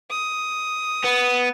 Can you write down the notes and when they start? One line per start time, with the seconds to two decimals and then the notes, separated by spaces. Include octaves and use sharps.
0.11 D#6
1.04 B3